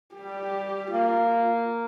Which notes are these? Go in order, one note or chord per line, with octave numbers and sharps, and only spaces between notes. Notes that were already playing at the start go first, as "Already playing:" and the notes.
G3 G4
A#3 F4